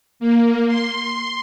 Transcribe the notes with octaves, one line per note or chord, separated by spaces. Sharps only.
A#3
C6